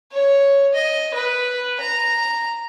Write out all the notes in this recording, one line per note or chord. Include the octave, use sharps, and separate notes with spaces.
C#5
D#5
B4
A#5